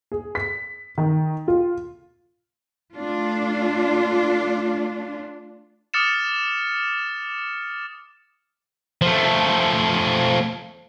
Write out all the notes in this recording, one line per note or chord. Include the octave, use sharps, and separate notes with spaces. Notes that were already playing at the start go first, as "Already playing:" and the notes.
G#4
B6
D#3
F4
A3 D4 F4
D6 D#6 F6 A6 C#7 E7
F3 A3